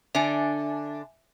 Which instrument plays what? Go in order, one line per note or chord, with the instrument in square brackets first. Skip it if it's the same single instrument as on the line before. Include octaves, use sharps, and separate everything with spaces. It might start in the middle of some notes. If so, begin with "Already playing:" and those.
[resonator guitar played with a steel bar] D3 D4 [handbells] E5 G#5